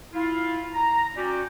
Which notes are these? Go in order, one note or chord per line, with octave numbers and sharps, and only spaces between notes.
E4 F4
A#5
C#4 F#4 G4 D5